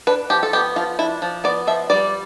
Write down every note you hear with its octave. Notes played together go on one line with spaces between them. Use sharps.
D4 B4
F3 G4
A4
B3 G4
F3 F4
D4 E4
F3
B3 D5
F3 E5
G3 D5